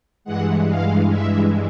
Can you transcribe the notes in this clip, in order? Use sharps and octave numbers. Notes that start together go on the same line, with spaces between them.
G2 E3 G#3 F#5
F5
E5